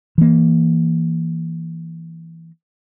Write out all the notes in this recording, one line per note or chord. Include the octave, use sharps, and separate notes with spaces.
E3 A#3